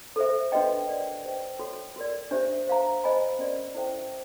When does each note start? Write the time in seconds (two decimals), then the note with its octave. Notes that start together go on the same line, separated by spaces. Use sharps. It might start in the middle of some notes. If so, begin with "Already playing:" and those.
0.16 A4 C5 E5
0.52 D4 F#4 B4 D#5 G5
0.87 A#4 D5 F#5
1.24 G4 C5 D#5 G5
1.59 F#4 A4 C#5
1.96 F#4 A#4 D5
2.31 D4 G4 C5 E5
2.67 C5 F5 A#5
3.04 C5 D#5 G#5 B5
3.39 C#4 F#4 A#4 D5
3.75 E4 A4 C5 E5 G5